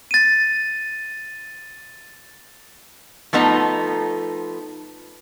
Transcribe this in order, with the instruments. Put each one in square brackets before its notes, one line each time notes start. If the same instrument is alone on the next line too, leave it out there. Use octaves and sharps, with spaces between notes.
[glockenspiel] A6 D#7
[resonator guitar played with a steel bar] F3 A3 B3 D#4 A#5